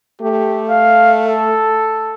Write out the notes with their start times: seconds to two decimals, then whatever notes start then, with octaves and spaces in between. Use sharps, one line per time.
0.22 A3 G4
0.70 F5
1.26 A4